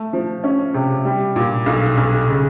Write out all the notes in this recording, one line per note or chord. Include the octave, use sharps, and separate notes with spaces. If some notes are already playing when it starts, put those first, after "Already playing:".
Already playing: A3
F3
C#4
C3
G3
A#2
B1
B1
C#3